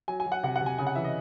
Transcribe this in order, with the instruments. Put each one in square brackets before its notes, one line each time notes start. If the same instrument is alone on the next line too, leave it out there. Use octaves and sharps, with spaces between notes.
[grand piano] F#3 G#5
G#5
F#3
F#5
C3 F#5
F#5
C3
G#5
C#3 G#5
F#5
E3 E5
D#5